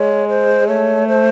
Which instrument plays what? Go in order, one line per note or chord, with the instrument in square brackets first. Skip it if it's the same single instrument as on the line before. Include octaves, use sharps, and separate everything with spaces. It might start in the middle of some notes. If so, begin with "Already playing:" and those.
Already playing: [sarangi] G#3 [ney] C#5
[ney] C5
[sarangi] A3 [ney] C#5
[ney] C5